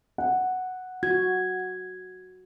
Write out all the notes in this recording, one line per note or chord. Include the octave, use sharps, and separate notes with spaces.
F#5
F#4 G#6